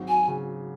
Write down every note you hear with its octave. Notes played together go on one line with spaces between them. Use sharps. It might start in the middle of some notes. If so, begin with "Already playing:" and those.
Already playing: G#1 F#3
G#5
C#3